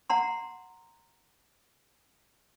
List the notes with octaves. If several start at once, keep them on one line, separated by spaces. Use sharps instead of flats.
F#5 A#5 C6